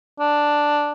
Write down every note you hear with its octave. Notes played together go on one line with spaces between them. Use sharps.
D4